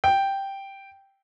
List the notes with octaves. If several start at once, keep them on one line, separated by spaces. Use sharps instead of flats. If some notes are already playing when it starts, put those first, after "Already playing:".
G5